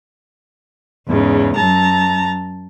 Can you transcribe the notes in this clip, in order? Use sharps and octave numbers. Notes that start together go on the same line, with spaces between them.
E2 G#2 C#3
F#2 A5 A#5